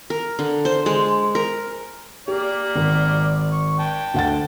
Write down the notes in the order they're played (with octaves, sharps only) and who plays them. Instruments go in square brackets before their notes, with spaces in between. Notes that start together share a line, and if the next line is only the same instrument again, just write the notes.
[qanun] A#4
D3
C5
G#3
A#4
[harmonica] A#3 D5 [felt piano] G4
[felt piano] G#1
[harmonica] C#6
G5 A5
[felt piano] D2 F#5 A6